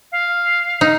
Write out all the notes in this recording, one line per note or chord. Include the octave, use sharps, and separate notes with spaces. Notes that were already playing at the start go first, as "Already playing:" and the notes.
F5
D#4